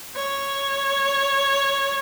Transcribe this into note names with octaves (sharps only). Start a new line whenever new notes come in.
C#5